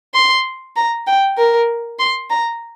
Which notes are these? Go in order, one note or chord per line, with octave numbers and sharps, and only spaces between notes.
C6
A#5
G5
A#4
C6
A#5